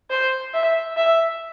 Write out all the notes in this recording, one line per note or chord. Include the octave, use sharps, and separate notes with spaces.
C5
E5
E5